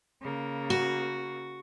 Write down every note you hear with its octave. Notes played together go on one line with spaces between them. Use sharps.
C#3 A#3
F#4